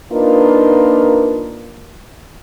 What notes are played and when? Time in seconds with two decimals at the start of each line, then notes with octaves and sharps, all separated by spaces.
0.12 A#3 D4 D#4 F4 A#4 B4